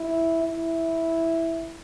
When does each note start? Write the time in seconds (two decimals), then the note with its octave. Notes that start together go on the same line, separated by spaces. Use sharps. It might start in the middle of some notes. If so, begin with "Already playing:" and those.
Already playing: E4
0.44 E4